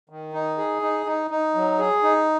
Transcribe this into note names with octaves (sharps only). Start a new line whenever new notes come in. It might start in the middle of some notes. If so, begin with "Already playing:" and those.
D#3
D#4
G#4
D#4
D#4
D#4
F#3
G#4
D#4